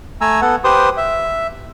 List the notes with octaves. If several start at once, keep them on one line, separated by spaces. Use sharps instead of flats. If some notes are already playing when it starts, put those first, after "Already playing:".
A3 G#5 A#5 E6
B3 A4 F#5
G4 B4 C5 C6 D#6
E5